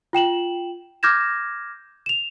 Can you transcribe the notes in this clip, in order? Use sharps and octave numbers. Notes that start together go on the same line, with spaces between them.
F4 G5 E7 F#7
D6 F6 G6 G#6 A#6 E7
E7 F7